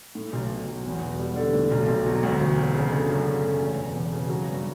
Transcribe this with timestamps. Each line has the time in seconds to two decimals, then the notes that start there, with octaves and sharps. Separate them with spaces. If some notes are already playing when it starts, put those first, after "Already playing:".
0.15 A2
0.33 B1
0.51 B1
0.68 F#3
0.85 E2
1.03 E1
1.19 G3
1.36 D3
1.53 A2
1.71 B1
1.88 B1
2.06 F#3
2.23 D2
2.40 E1
2.58 F#3
2.74 C#3
2.92 D3
3.09 F#2
3.26 C#4
3.44 A3
3.61 E2
3.78 E1
3.95 E1
4.13 C#3
4.30 F#3
4.48 G2